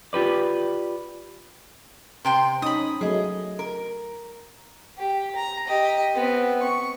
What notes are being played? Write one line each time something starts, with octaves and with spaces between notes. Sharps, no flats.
F4 G4 B4 D5
C3 C5 G5 C6
C#4 D#4 B5 D#6
F#3 A3 G#4 D#5
A#4
G4
A#5
G4 D#5
B3 C4
C#6